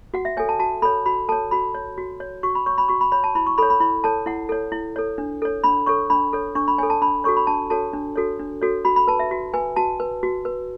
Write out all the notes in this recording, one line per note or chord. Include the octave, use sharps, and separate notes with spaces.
F#4 F#5
E5
A4 C#5 G#5
A5
F#4 A5
A4 C#5 B5
F#4 B5
A4 C#5 A5
F#4 B5
C#5
F#4
C#5
F#4 C#6
B5
C#5 C#6
B5
F#4 C#6
B5
C#5 B5
A5
E4 B5
C#6
A4 C#5 B5
B5
E4 B5
A4 C#5 A5
E4 F#5
A4 C#5
E4
A4 C#5
D4
A4 C#5
D4 B5
A4 C#5 C#6
D4 B5
A4 C#5
D4 C#6
B5
A4 C#5 G#5
A5
D4 B5
F#4 A4 C#5 C#6
B5
D4 A5
F#4 A4 C#5 A5
D4
F#4 A4 C#5
D4
F#4 A4 C#5
F#4 B5
B5
B4 A5
E5
F#4
B4 G#5
F#4 A5
B4
F#4
B4